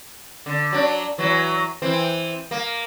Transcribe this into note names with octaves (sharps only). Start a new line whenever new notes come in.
D3
F#3 D4
E3 F#3
E3 C4
A#3